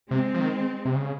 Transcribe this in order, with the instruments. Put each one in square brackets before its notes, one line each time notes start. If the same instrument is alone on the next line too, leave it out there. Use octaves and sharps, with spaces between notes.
[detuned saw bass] C3 [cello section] G#3 C4
[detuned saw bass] F3
D#3
C3
C#3